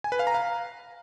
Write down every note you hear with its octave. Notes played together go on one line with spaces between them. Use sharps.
G#5
B4
F5
A#5
F5